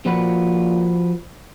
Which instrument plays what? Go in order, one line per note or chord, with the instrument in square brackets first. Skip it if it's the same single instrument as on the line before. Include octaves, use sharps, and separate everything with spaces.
[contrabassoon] A#2 [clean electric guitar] F3 F#4 B4